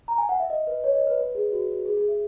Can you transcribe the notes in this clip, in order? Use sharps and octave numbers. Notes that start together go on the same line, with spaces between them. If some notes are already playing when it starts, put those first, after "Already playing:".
A#5
G#5
F#5
E5
D#5
B4
C#5
D#5
B4
B4
G#4
F#4
F#4
G#4
G#4
E5